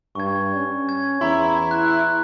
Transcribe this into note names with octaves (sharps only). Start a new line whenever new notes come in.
G2 C#6 G#6
C#4
G#6
E2 E4 A#5 C6
F#6